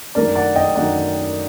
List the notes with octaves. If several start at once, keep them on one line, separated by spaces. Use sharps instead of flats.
F#2 D#3 A3 D4 A#4 D5
D5 F#5
D#5 G5
F#2 D#3 A3 D4 D5 F#5